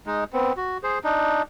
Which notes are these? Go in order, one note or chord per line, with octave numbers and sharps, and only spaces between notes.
G#3 D#4
B3 C4
F#4
G#4 C5
D4 D#4